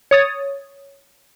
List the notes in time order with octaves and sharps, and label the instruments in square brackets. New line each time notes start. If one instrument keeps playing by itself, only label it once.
[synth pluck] C#5 D#6 A6